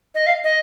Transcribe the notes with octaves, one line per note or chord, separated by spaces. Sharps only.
D#5
F5
D#5